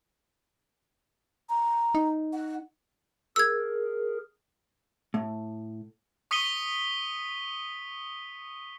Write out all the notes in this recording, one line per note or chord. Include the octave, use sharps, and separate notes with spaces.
A#5
D#4
F#5
G#4 A#4 E6 G#6
A2
C#6 D#6 B6 C#7 D#7 G7